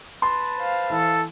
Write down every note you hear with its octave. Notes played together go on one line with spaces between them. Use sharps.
B4 A5 C6
C5 F5
E3 A4